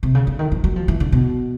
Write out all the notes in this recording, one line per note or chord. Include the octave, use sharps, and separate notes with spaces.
C3
C#3
D3
D#3
F3
F#3
F3
E3
D3
B2